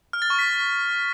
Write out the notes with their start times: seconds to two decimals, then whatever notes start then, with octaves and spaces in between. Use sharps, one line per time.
0.13 F6
0.22 A6
0.30 C#6
0.39 B6